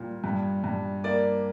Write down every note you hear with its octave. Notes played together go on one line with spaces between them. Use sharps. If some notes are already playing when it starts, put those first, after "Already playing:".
Already playing: A#2 G3
G2
G2
A#3 D5